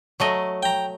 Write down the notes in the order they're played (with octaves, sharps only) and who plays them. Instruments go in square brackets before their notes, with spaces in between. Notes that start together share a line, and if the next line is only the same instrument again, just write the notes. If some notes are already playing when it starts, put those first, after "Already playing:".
[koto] F#3 A3 D#5
[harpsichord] G5 A#5